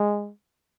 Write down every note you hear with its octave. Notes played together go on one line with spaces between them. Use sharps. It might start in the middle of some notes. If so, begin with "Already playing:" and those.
Already playing: G#3